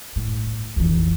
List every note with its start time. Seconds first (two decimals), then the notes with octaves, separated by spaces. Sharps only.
0.16 A2
0.76 F2 E3